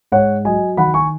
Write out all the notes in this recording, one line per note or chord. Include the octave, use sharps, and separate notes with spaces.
G#2 C#5 F#5
F#3 D#5 G#5
D#3 F#5 B5
G#5 C#6